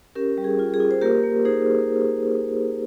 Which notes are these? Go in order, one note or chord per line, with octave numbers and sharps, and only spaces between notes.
C#4 G4 A#4
G3
G#4
F4
G#4
F4
C5
A#3 G4 A#4
A#3
D#4 G#4 C5